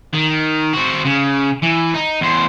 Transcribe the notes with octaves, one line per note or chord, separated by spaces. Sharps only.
D#3
C4 F#4
C#3
E3
D#4
E2 C5